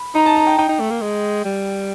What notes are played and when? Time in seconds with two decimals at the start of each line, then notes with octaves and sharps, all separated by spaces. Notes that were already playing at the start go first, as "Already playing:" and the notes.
Already playing: B5
0.15 D#4 A#5
0.26 A5
0.36 A#5
0.47 G5
0.58 D#4 G5
0.69 D#4
0.80 A3
0.90 A#3
1.01 G#3
1.45 G3